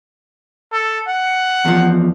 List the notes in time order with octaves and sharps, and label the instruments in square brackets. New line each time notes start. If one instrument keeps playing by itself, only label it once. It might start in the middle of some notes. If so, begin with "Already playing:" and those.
[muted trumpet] A4
F#5
[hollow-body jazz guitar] E2 F3